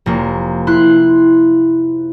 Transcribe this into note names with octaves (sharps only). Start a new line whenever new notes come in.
F1 A#3
E4 C6 F#6